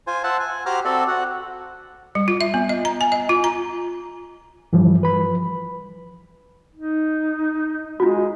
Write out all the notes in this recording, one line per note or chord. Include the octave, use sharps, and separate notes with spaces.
F4 C5 G#5
C5 E5 F#5 A5
G#5
F#4 G4 C5 A#5 D6 F6
C4 F#4 A4 D5 E5
F#4 F#5
G3
F4
E5
B3
D#5
A#5
G#5
D#5
F4
A#5
G2 E3 F3 G3
B4 B5
D#4
G#3 F4 F#4